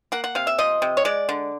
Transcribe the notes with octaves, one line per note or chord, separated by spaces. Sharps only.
A#3 F#5
F#5
C3 F5
E5
F3 D#5
C3
C#5
G#3 D5
D3